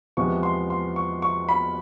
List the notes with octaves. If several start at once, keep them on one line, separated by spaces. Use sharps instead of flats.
E2 C3 F3 G#3 B3 C#6
C6
C6
C#6
C#6
B5